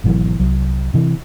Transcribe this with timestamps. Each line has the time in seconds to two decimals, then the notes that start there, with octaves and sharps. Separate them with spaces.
0.04 G#1 B2 E3 F#3
0.40 C2 F#3
0.94 C3 E3